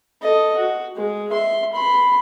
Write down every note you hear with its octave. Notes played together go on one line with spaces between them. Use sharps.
A4 D#5
F#4
G#3
E5 C6
B5 C6